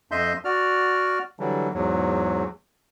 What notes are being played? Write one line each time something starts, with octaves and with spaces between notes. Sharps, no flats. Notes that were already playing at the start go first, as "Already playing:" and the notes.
F2 D#5 E5 C6 G6
F#4 D5 F6
D3 E3 F#3 G3
E2 G#2 F#3